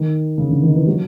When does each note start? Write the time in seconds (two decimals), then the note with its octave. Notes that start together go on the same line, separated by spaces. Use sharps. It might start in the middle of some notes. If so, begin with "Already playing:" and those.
Already playing: D#3
0.38 C#3
0.50 D3
0.62 D#3
0.74 E3
0.87 F#3